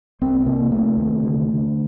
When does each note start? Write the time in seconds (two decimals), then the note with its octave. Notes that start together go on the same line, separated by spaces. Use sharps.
0.21 C2 C4
0.40 C4
0.46 C3 A#3
0.71 C3 A3
0.97 D#2
1.23 D3
1.48 D3